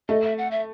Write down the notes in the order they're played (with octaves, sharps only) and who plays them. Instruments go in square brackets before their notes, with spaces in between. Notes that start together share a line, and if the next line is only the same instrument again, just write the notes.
[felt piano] A3 [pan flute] D#5
[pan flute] E5
F#5
E5